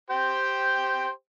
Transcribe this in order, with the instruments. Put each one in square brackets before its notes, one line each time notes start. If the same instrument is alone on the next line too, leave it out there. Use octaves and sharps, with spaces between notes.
[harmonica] G4 C5 G5